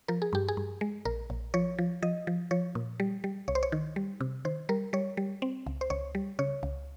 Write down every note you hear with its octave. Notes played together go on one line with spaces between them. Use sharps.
F3 A#4
G#4
G2 G4
G#4
G2
G#3
A#1 A#4
A#1
F3 C#5
F3
F3 D#5
F3
F3 C#5
A#2
G3
G3
C2 C#5
C5
C#5
D#3
G3
C3
D#3 C5
G3 A#4
G3 C#5
G3
C4
C#2
C5
C#2 C#5
G3
C#3 C#5
C#2